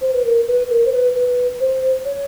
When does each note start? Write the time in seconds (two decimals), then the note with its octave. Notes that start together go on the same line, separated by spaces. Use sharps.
0.01 C5
0.13 B4
0.24 A#4
0.47 B4
0.69 A#4
0.85 C5
0.92 B4
1.15 B4
1.60 C5
2.04 C#5